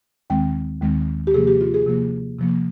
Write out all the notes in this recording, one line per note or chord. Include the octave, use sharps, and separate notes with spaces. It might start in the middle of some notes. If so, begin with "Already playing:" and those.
D#2 D#3 G#3 C4 G5
D#2 D#3 G#3 C4
G4
C3 F3 A#3 G#4
G4
F4
G#4
C3 F3 A#3
C3 F3 A#3